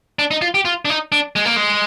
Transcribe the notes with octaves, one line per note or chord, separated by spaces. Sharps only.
D4
D#4
F4
G4
F4
D4
D#4
D4
G#3
A#3
G#3